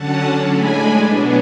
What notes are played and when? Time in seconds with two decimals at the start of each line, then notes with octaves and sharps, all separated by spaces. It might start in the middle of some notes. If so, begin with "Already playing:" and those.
Already playing: D3 F#3 C#4 F#5 A5
0.48 A2 G#3 D4 G#5 B5
1.06 B2 F#3 B3 D4